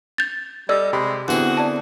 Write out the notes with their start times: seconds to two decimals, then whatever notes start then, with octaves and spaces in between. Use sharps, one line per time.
0.18 G6 A6
0.69 G3 A4 D5 D#5 E6
0.93 C3 G#3 G4 B5
1.28 E2 D3 C4 F#4 G#4
1.57 D5 A5